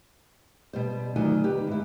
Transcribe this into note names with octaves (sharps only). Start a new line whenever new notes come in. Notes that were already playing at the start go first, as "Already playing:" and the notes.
B2 G3 C5
D2 D#3 F#3 F4 G#5
G4 B4
G#2 E4